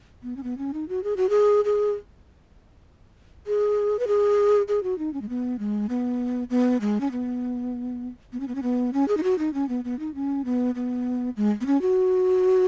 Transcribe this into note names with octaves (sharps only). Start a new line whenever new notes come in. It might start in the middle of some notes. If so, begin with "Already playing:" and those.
B3
C#4
B3
C#4
D#4
F#4
G#4
F#4
G#4
G#4
G#4
B4
G#4
G#4
F#4
D#4
C#4
G#3
B3
G#3
B3
B3
G#3
C#4
B3
B3
C#4
B3
C#4
B3
C#4
G#4
D#4
F#4
D#4
C#4
B3
B3
D#4
C#4
B3
B3
G#3
B3
C#4
F#4